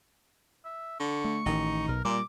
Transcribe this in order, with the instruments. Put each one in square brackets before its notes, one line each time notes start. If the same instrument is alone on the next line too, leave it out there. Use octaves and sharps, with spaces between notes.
[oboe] E5
[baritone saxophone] D3 [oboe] C#6
[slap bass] A3
[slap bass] A1 D#3 [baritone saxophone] D#4
[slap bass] B1 [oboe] A#4
[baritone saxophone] A#2 [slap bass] G3 [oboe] D6